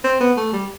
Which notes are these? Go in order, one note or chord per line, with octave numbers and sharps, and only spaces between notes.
C4
B3
A3
G3